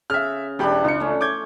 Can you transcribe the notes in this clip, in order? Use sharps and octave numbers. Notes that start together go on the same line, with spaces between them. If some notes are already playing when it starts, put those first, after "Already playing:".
C#3 E5 F6
E1 E3 D4 G4 B5
C#2 D4 F4 C#7
A3 C#4
C#5 D6 G6 G#6